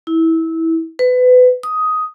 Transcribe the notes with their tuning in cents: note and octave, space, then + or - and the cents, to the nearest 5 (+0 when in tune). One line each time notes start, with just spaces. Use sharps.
E4 -20
B4 +25
D#6 +10